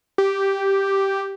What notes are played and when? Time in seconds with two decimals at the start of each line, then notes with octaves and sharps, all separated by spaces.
0.18 G4